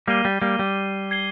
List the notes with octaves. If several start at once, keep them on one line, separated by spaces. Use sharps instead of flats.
G3 A#3 D6 G#6 C7 D#7 G7
G3
G3 A#3
G3
G#6 C7 G7